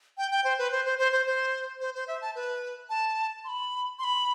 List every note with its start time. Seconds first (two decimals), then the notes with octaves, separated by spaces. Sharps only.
0.18 G5
0.31 G5
0.44 C5
0.58 B4
0.72 C5
0.85 C5
0.99 C5
1.12 C5
1.27 C5
1.81 C5
1.95 C5
2.08 E5
2.21 A5
2.35 B4
2.90 A5
3.44 C6
3.48 B5
3.99 C6
4.04 B5